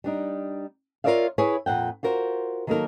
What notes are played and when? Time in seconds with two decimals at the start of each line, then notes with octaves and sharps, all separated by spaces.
0.04 G3 D4 D#4
1.04 F4 A#4 C#5 D5 E5 F5
1.38 E4 G#4 B4 C#5
1.66 F2 A#2 F#5 G5
2.03 F4 F#4 A#4 C5
2.67 D#3 F#3 A#3 D#4 A4 A#4